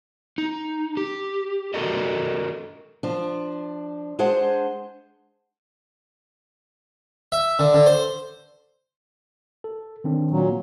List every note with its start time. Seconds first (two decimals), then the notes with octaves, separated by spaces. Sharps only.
0.38 D#4
0.97 G4
1.74 F#4 A4 A#4 D5 D#5
3.03 F3 D4
4.19 G#3 D4 G#4 C5 F#5
7.32 E5
7.59 D3
7.74 D3
7.86 C5
9.64 A4
10.04 D#3 C4 D4
10.31 A#2 F#3